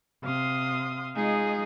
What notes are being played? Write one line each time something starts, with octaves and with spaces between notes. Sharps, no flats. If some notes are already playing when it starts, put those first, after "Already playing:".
C3 F5 C6 D#6
G#3 D#4 F4 G#4